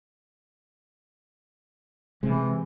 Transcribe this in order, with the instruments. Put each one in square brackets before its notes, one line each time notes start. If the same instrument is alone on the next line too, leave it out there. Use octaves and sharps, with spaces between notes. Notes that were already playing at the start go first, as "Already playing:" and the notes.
[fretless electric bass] C3 G#3 [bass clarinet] E3